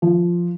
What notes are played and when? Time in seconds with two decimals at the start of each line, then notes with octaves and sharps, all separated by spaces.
0.02 F3